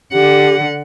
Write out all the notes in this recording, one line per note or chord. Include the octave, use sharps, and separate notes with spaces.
D3 G4 F#5